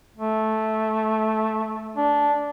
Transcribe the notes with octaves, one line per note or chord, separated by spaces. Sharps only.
A3
D4